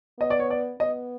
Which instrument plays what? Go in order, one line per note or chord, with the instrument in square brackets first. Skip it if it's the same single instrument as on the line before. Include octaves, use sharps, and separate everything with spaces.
[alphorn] B3 [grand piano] D#5
[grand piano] D5
C#5
D5
[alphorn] B3 [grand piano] D#5